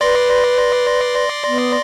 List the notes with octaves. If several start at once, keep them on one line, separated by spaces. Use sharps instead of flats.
B4 D5 C6 A#6
B3